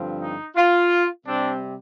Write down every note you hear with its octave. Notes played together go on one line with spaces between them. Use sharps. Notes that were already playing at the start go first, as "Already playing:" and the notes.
Already playing: G2 D3 F3 C4
D#4
F4
C3 G3 C4 D4